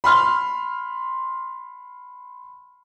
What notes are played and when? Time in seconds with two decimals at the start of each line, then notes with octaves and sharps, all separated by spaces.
0.04 B5 C6 F6